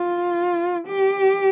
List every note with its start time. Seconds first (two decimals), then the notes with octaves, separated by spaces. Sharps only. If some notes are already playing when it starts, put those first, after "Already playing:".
Already playing: F4
0.87 G4